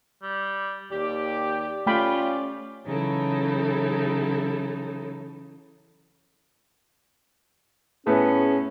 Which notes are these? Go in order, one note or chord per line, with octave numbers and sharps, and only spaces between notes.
G3
D#2 G4 D5
A3 C#4 F4 G4 G5 B5
C#3 E3 F#3 D#4 E4 A4
A2 B3 C#4 G#4